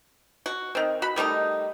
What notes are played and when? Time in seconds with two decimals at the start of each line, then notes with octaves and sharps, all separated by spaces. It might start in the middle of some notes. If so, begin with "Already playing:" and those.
0.46 F#4
0.75 D#3 C4
1.02 F#4 B5
1.16 D#3 G3 A3 D#4